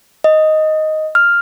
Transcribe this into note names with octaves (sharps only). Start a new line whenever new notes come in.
D#5
F6